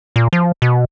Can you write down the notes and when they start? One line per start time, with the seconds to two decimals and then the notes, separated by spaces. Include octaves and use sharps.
0.16 A#2
0.33 F3
0.62 B2